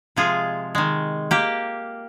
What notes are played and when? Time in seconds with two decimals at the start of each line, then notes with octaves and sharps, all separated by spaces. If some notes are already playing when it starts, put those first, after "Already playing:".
0.16 C3 F3 G#3 F4 G#4
0.75 D#3 G#3
1.31 A#3 G4